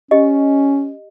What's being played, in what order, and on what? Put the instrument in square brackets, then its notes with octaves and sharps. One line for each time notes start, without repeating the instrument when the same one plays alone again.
[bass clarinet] C#4 [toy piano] G4 D#5